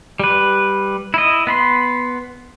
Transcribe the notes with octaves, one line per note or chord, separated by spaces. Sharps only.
G3 B4
E4 D#5
B3 B5 C6